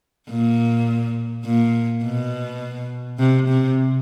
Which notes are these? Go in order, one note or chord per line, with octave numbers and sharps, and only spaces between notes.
A#2
A#2
B2
C3
C3